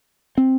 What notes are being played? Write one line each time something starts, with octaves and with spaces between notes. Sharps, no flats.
C4